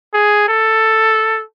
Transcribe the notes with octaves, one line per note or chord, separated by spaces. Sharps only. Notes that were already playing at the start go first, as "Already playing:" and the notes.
G#4
A4